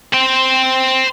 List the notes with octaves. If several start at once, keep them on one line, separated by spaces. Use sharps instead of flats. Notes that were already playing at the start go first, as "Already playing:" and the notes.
C5 G5